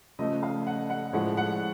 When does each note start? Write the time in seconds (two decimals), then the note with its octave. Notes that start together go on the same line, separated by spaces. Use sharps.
0.19 C#3 F3 A3 D#5
0.43 F5
0.67 F#5
0.90 F#5
1.13 A2 F3 G#3 F#5
1.37 F#5